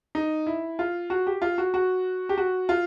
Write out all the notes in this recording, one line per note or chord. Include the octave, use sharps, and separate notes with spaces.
D#4
E4
F4
F#4
G4
F4
F#4
F#4
G4
F#4
F4